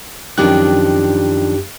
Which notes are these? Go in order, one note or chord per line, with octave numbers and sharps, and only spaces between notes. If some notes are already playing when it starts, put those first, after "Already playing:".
F#2 D#3 F3 D4 G4 F#6